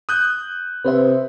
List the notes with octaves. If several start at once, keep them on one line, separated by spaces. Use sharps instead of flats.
D#6 F#6 G6
C3 B4 C5 E5